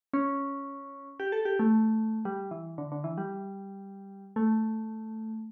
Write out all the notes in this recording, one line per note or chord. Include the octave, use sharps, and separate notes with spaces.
C#4
G4
A4
G4
A3
G3
E3
D3
D3
E3
G3
A3